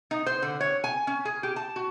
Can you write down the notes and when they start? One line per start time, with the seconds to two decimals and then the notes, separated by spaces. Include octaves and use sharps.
0.11 D#4
0.26 C5
0.42 D3
0.61 C#5
0.84 G#5
1.07 C#4
1.25 G#4
1.43 G4
1.56 A5
1.76 F#4